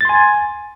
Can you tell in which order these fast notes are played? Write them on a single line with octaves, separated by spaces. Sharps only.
A6 C6 G#5